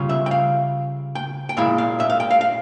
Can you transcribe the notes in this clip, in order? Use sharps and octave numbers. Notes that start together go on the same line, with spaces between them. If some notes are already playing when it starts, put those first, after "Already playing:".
Already playing: C#3 G3 C#4 F4
E5
G5
F5
G5
G5
A#2 G#3 E4 F5
F5
E5
F5
G5
F5
F5